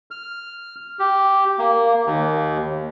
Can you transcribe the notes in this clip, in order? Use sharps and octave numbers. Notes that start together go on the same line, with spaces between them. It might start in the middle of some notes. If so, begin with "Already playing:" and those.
F6
G4
A#3
D#2